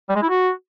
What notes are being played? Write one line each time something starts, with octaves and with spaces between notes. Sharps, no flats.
G3
G#3
E4
F#4